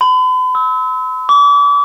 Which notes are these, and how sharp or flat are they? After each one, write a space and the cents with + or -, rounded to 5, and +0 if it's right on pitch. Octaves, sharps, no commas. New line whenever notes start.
B5 +45
E6 -35
D6 -40